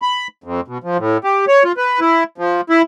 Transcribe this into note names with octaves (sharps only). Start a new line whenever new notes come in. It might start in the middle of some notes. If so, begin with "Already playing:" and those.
B5
F2
B2
F3
A2
G4
C#5
F4
B4
E4
F3
E4